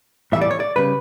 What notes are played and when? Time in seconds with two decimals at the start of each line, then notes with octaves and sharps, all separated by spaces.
0.32 A2 E3 G3 E5
0.41 D5
0.51 C#5
0.60 D5
0.76 C#3 G3 B4